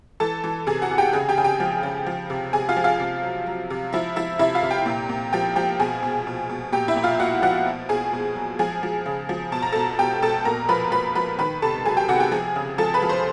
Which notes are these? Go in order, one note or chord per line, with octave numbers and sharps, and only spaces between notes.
E3 A4 A5
E3
C3 G#4 G#5
F#4 F#5
C3
G4 G5
C#3 G#4 G#5
G4 G5
C#3 G#5
G4 G5
F3
C#3
F3
C3
C3 G#4 G#5
F4 F5
F3
F4 F5
C3
F#3
F#3
C3
F3 E4 E5
F3 E4 E5
C3 E4 E5
F4 F5
C3
G4 G5
A#2
A#2
F3 G4 G5
F3 G4 G5
B2 G#4 G#5
B2
B2
B2
A#2 G4 G5
E4 E5
A#2
F4 F5
A#2 F#4 F#5
F3 F#4 F#5
B2
B2 G#4 G#5
B2
F#3
F3 G#4 G#5
F3
C#3
F3
B2 A5
A#5
B2 A4 A5
B2 G4 G5
B2 A4 A5
A#2 A#4 A#5
F3 B4 B5
F3 B4 B5
F3 B4 B5
D#3 B4 B5
C3 A4 A5
F#3 G#4 G#5
G4 G5
C3 F#4 F#5
G4 G5
F3 G#4 G#5
C#3
F3 A4 A5
B4 B5
F3
C5 C6